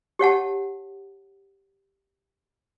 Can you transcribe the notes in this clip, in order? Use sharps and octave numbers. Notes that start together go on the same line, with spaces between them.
G4 C#5 F#5 A5